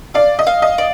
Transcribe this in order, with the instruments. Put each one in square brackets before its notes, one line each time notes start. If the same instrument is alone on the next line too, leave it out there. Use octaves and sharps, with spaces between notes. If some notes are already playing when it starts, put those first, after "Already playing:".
[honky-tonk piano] D5 [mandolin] F5
[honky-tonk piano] D#5
[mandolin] F5
[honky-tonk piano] D#5
[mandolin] D5